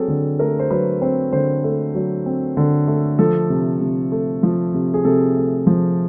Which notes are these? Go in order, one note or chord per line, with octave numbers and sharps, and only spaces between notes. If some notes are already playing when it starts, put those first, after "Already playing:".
Already playing: F#3 C4 G#4 A4
D3
A3 A#4
C5
F#3 B4
C4 C5
D3 C5
A3
F#3
C4
D3
A3
F3 A4
C3
C3
A3
F3
C3
G#4
C3 A4
A3
F3